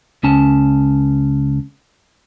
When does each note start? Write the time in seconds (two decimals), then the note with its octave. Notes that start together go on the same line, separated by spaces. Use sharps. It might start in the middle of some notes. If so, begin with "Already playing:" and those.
0.23 C#2 C#4 A5